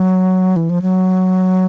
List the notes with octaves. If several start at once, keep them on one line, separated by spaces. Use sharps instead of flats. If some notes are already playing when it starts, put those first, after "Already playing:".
Already playing: F#3
E3
F3
F#3